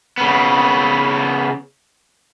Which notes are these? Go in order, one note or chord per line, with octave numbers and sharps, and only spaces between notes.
C#3 B3